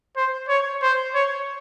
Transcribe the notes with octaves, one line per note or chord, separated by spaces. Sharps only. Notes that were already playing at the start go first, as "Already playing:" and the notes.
C5
C#5
C5
C#5